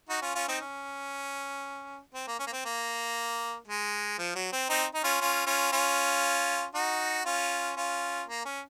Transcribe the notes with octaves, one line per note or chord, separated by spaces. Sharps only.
D#4 F#4
C#4 F4
C#4 F4
C4 D#4
C#4
C4
A#3
C#4
A#3
C4
A#3
G#3
F3
F#3
C4
C4 D#4
D#4
C#4 F4
C#4 F4
C#4 F4
C#4 F4
D#4 F#4
C#4 F4
C#4 F4
A#3
C#4